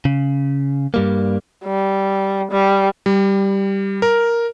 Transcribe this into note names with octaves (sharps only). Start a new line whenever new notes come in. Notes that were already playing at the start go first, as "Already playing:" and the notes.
C#3
G2 G3 A#3
G3
G3
G3
A#4